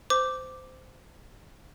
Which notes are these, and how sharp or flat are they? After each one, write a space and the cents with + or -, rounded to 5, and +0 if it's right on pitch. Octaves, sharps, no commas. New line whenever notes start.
C5 -20 D6 +0